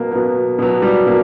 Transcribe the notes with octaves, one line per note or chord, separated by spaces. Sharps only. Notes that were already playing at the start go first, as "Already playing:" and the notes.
Already playing: B2 F#3 A#3 B3
B2 F#3 B3
B2 F#3 B3
G3
B2 A#3